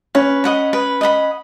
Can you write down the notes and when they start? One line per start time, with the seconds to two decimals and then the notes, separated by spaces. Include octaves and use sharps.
0.15 C#4 B4
0.44 D#5 F#5 B5
0.73 B4
1.01 D#5 F#5 B5